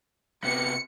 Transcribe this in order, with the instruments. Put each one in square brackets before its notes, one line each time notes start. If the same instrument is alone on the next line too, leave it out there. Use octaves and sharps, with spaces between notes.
[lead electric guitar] C3 B3 [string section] C#7